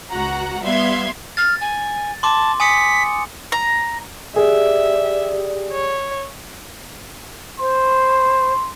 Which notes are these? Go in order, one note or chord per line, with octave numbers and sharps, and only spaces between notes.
C#2 F#4 F#5 A#5
G3 B3 E5 F5 C6 G#6
F6 A6
G#5
A5 C6 D6
G#5 D#6 B6 C#7
A#5
G4 G#4 D5 E5
C#5
C5 C6